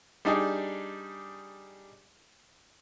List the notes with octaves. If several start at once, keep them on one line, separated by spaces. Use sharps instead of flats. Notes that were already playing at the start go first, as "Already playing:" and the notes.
G3 D4 D#4 G#4